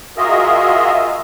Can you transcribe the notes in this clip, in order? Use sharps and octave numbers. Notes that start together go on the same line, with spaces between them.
F4 F#4 G#4 A#4 D#5 E5